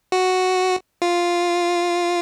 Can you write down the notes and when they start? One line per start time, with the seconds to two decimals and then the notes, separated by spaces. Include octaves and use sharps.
0.12 F#4
1.02 F4